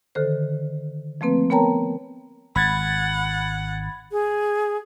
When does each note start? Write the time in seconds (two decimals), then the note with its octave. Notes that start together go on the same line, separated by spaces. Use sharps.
0.15 D3 D#3 A4 C5
1.21 F3 A3 A#3 C4 B4
1.50 B3 A#4 C#5 G5 A5 A#5
2.56 G#1 F#5 B5 G#6 A6
4.11 G#4